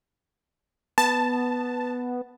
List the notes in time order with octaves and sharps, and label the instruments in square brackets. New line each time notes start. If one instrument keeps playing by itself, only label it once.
[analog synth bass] B3 [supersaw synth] A5